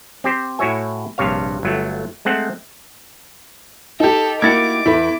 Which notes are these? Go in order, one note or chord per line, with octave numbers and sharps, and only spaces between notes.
C4 G4 C5
A2 E4 F#4 C#5 E5 G#5
A#1 G2 C3 C#5 F5
G1 F#3 A3
G#3 A3 C4 F#5
D#4 G4 A4
A#3 E4 F#4 D6 G#6 A6 C#7
E2 E4 A4 B4